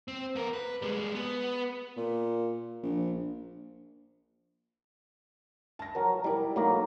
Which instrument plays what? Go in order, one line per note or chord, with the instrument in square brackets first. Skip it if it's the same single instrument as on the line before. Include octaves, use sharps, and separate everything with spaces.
[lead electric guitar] C4
B3 A#4
B4
G3 G#3
B3
[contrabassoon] A#2
A#1
[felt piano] A5 A#6
[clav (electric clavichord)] F#3 A#4
[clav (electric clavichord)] G3 D5 [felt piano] E4 A#4
[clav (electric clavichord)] F#3 A#3 A#5 [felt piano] A3 D#4